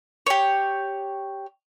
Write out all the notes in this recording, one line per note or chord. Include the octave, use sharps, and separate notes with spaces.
G4 C#5